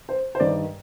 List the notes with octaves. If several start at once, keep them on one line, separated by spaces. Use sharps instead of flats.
C5
C5
G2 D#3 D5